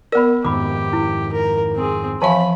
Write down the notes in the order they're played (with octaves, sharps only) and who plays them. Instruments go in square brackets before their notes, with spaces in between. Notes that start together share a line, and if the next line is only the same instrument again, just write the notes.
[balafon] B3 D5 [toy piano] A#4 B5
[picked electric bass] F2 G#2 D#3 [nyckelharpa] G4 [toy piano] B5 D6
[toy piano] E4
[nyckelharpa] A#4
C4 G#4
[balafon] E3 F3 E5 [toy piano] F5 G#5 A5 [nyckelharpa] B5